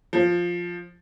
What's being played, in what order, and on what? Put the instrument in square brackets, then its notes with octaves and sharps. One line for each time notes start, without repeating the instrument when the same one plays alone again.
[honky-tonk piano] F3